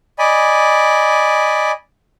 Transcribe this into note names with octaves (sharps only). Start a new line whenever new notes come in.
D5 D#5 G#5 B5